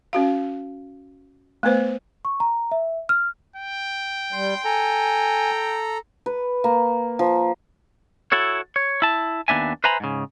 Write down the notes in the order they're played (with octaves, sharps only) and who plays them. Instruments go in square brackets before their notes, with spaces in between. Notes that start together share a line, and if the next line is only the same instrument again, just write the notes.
[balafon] C#4 F#4 F5
A3 B3 B4 C5
[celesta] C#6
A#5
E5
F6
[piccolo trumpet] G5
[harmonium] G3 [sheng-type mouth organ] C6 G6
[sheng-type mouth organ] A4 A#5 [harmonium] G#5
[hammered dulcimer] B4
A#3
F3
[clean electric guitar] E4 F#4 A4 C#5
C#5
E4 A5
D#2 B3 D4 E5 G#5
B4 C5 E5 G#5 A#5 B5
G#2 C#3